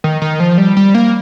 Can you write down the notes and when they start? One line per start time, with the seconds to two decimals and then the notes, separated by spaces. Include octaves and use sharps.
0.04 D#3
0.22 D#3
0.40 F3
0.58 G3
0.77 G3
0.95 A#3